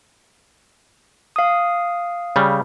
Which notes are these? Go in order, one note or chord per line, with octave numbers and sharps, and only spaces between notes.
F5 D#6
C#3 G3